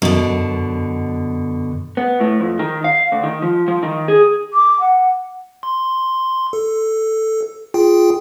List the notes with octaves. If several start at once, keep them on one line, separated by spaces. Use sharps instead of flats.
F#2 B2 D3
B3
A2
F2
D#3
F5
D2
D#3
F3
F3
D#3
G#4
D6
F#5
C6
A4
F4 G#4 G5